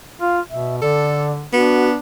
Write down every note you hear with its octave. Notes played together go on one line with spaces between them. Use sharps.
F4 F5
B2 E5
D3 A4 D5
B3 D4 F#4